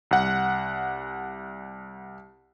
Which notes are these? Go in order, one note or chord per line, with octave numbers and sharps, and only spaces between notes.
C2 F#5